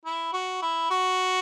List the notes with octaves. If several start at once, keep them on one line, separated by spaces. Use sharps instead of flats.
E4
F#4
E4
F#4